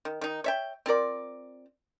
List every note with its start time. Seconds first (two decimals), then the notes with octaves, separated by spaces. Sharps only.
0.05 D#3
0.21 D#3 D#4
0.44 C#5 E5 G5
0.86 C4 F4 A#4 D5